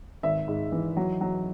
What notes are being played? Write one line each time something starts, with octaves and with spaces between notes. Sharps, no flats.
G#1 E5
G#2
E3
F#3
F#3